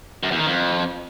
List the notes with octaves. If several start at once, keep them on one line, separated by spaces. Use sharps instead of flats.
F#2
E2
D#3
F2